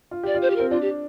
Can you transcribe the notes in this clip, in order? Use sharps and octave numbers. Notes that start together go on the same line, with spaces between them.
F4
G4 D5
F4
C5
G4
C4 A#4
D4 F4
G4